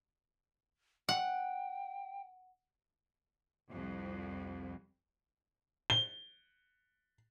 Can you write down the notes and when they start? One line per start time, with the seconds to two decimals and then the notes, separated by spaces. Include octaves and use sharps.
1.09 F#5 G5
3.71 C2 F2
5.90 G7